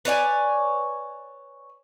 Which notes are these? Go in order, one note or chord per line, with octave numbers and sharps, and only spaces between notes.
B4 C#5 D5 G#5